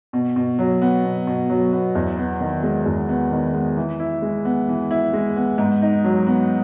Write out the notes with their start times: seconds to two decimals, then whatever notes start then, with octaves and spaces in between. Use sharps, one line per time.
0.13 B2
0.36 B2
0.59 F#3
0.82 B3
1.04 B2
1.27 B2
1.50 F#3
1.73 B3
1.95 E2
2.18 B3
2.41 D#3
2.63 G#3
2.86 E2
3.09 B3
3.31 D#3
3.54 G#3
3.77 E3
4.00 E4
4.22 G#3
4.45 B3
4.68 E3
4.91 E4
5.13 G#3
5.36 B3
5.58 G#2
5.82 D#4
6.04 F#3
6.27 B3